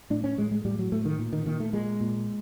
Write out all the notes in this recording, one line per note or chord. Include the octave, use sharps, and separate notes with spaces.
A2 D4
C#4
A2 G#3
G#3
A2 G3
F#3
A2 A3
D#3
A#2
D#3
A#2 D#3
A3
A#2 G#3
A#2